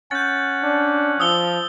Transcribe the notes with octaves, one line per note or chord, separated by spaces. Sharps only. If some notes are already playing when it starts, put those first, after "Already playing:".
C#4 F#5 G6 A6
D4
F3 D#6 E6 G7